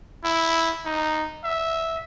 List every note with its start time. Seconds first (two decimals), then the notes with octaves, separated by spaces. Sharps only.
0.24 E4
0.85 D#4
1.44 E5